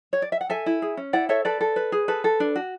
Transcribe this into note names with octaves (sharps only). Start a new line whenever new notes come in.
C#5
D5
E5
F#5
A4 E5 G#5
E4
G#4
C#4
E4 D5 F#5
A4 C#5 E5
A4 B4 D5
A4
B4
G#4
A4 B4
A4
D4
F#4